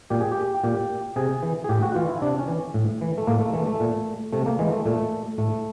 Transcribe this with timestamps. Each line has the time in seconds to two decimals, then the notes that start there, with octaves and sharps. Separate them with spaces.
0.10 A#2 G4
0.21 G#4
0.32 G4
0.64 A#2 G4
1.16 C3 G#4
1.43 E3
1.64 G#4
1.69 A2 G4
1.82 F#4
1.95 E3 F4
2.09 E4
2.22 C3 D4
2.39 C#4
2.48 E3
2.74 A2
3.01 E3
3.18 A3
3.27 A2 A#3
3.40 A3
3.53 E3 A3
3.67 A3
3.80 A#2
4.33 C3 A3
4.46 A#3
4.59 E3 G#3
4.72 A3
4.85 A#2 A3
5.38 A2 A3